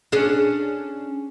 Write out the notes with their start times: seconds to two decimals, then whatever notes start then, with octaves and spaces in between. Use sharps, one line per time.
0.12 C#4 D4 G#4